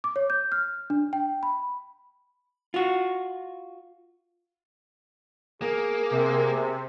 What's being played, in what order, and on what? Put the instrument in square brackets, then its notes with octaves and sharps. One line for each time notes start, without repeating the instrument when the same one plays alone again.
[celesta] D6
C#5
G6
F6
D4
G5
B5
[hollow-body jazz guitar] F4 F#4
[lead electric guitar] A#3 [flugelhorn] G#4
[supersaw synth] C3